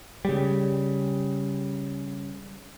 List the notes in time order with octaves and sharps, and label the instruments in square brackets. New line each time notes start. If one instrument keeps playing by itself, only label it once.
[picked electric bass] C#3 G3